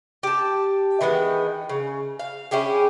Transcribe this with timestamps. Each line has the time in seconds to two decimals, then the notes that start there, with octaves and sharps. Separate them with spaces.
0.23 G4 A5
1.01 D#3 E3 G#3 B3
1.69 C#3
2.19 F5
2.51 C#4 E4 G4 G#4